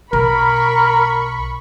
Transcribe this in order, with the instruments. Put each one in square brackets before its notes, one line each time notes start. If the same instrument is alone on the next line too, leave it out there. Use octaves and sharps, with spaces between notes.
[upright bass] B1 [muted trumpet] A#4 [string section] B5 C#6